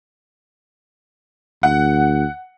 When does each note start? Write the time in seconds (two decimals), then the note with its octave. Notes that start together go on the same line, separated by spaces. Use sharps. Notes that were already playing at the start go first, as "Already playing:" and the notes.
1.63 D2 F#5